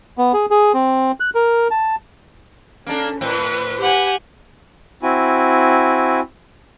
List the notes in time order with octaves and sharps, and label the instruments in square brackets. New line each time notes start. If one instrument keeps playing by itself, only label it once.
[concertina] B3
G#4
G#4
C4
F#6
A#4
A5
[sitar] A#3 D4 [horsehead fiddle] C#4 A4
[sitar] A2 C4 [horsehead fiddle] B4
[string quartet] G4 F#5 G#5
[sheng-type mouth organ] C4 E4 F#4 G#5